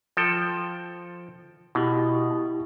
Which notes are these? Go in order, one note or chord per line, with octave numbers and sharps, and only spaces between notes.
F3 A4 G5
B2 E4 G4